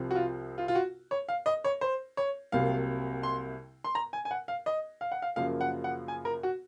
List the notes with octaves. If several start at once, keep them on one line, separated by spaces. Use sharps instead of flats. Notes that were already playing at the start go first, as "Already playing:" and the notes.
Already playing: C2 C3 F3 C4
F#4
F4
F4
F4
F#4
C#5
F5
D#5
C#5
C5
C#5
C2 C3 F#3 A#3 F5
C6
C6
A#5
G#5
G#5
F#5
F5
D#5
F5
F#5
F5
F#2 C#3 F3 A#3 F5
F#5
F#5
G#5
A#4
F#4